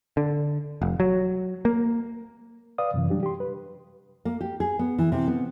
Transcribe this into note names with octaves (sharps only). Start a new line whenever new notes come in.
D3
F1
F#3
A#3
B4 D5 F5 D#6
F#2 C3 E3
F#3 G3 D4 G4
G4 C6
B4
A#3
G4
G#4
B3
E3
C3
B3